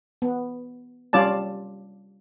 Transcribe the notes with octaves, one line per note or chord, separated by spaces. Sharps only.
B3
G3 C#4 F4 D5 A5